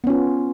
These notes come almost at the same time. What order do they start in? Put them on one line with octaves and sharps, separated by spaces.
B3 C#4 F4